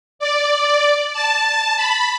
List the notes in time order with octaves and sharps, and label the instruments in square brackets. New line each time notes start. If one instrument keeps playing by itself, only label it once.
[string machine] D5
A5
B5